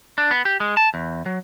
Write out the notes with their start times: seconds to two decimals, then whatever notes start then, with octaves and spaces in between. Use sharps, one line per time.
0.18 D4
0.31 B3
0.45 G4
0.60 G#3
0.77 A5
0.94 E2
1.26 F#3